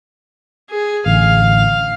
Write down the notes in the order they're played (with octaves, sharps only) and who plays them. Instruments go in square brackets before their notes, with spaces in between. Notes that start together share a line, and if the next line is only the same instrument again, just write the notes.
[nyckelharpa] G#4
[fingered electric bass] A1 D3 [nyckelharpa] F5